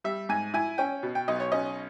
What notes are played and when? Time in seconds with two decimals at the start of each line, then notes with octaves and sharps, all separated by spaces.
0.04 G3 E5
0.29 G#2 G#5
0.54 E4 G#5
0.78 C#4 G5
1.03 B2
1.15 G5
1.28 B1 D#5
1.40 C#5
1.52 C#4 D#5